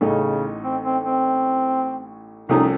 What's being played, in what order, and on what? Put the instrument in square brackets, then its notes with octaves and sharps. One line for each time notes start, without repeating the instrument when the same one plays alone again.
[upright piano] A1 A2 A3 D#4 [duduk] C#3
[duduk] C4
C4
C4
[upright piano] C2 C3 F3 A3 C#4 [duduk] D#4